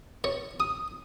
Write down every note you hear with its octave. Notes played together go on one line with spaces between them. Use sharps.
C#5
D#6